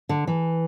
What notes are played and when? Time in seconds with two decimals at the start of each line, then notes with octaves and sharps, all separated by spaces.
0.09 D3
0.27 E3